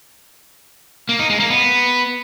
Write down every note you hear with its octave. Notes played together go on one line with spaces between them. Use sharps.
A#3
D#4
G#3
A#3
B3